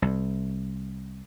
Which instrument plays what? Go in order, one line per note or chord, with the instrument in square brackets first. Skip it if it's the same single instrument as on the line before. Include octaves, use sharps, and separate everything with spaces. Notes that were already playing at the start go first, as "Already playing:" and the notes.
[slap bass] C2